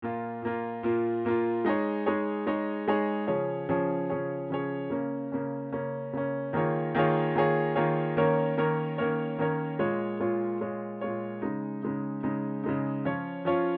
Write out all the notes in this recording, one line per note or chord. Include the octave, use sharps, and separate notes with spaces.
A#2 A#3 F4
A#2 A#3 F4
A#2 A#3 F4
A#2 A#3 F4
G#3 D#4 G#4 C#5
G#3 D#4 G#4 C#5
G#3 D#4 G#4 C#5
G#3 D#4 G#4 C#5
C#3 F3 C#4 G#4 C#5
C#3 F3 C#4 G#4 C#5
C#3 F3 C#4 G#4 C#5
C#3 F3 C#4 G#4 C#5
C#3 A#3 C#4
C#3 A#3 C#4
C#3 A#3 C#4
C#3 A#3 C#4
D#3 A#3 F4 G#4 C#5
D#3 A#3 F4 G#4 C#5
D#3 A#3 F4 G#4 C#5
D#3 A#3 F4 G#4 C#5
D#3 A#3 C#4 A#4 C#5
D#3 A#3 C#4 A#4 C#5
D#3 A#3 C#4 A#4 C#5
D#3 A#3 C#4 A#4 C#5
A#2 G#3 F4 C#5
A#2 G#3 F4 C#5
A#2 G#3 F4 C#5
A#2 G#3 F4 C#5
C#3 G#3 D#4
C#3 G#3 D#4
C#3 G#3 D#4
C#3 G#3 D#4
F3 C#4 F4 C#5
F3 C#4 F4 C#5